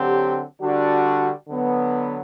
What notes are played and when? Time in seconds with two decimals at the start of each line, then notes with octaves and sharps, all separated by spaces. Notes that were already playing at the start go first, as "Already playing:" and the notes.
Already playing: D3 F#3 C4 G4
0.60 D3 G3 D4 F#4
1.49 D3 F#3 B3